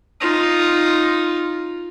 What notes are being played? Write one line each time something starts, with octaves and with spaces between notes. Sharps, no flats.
D#4 F4